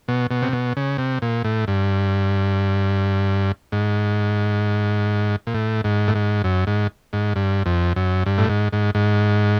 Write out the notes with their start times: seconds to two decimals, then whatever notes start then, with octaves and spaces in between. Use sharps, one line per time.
0.08 B2
0.31 B2
0.42 C3
0.53 B2
0.77 C#3
0.98 C3
1.22 A#2
1.44 A2
1.68 G2
3.72 G#2
5.47 A#2
5.54 A2
5.84 G#2
6.08 A2
6.15 G#2
6.44 F#2
6.67 G#2
7.13 G#2
7.36 G2
7.66 F2
7.96 F#2
8.26 G2
8.38 A2
8.49 G#2
8.73 G#2
8.95 G#2